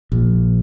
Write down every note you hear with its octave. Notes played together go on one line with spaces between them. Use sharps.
A#1